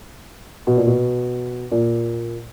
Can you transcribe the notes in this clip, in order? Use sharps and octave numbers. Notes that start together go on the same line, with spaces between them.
B2
A#2
B2
A#2